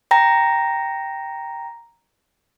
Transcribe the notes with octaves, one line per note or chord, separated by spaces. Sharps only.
G5 A#5 A#6